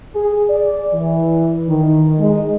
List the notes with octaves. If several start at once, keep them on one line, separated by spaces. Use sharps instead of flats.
G#4
D5
E3
D#3
G#3